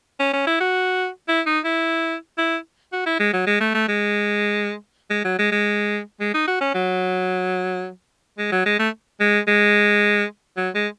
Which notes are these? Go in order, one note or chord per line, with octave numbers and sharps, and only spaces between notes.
C#4
C#4
E4
F#4
E4
D#4
E4
E4
F#4
E4
G#3
F#3
G#3
A3
A3
G#3
G#3
F#3
G#3
G#3
G#3
D#4
F#4
C#4
F#3
G#3
F#3
G#3
A3
G#3
G#3
F#3
G#3